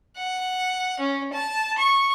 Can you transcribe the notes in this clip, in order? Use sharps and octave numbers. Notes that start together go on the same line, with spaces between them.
F#5
C#4
A5
C#6